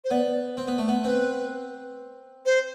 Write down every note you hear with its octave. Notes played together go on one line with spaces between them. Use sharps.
C5
B3 D5
C4
B3
A3
B3
C4 B4
C5